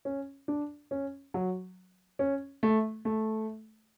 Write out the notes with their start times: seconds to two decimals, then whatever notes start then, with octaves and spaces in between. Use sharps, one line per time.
0.05 C#4
0.48 D4
0.91 C#4
1.34 F#3
2.19 C#4
2.63 A3
3.05 A3